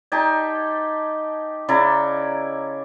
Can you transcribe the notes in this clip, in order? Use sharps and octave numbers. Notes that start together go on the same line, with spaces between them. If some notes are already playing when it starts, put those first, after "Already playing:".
D#4 G4 G#5 A5
C#3 E4 D5 A#5